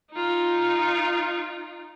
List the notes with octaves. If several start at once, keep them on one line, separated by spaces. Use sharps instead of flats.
D#4 F4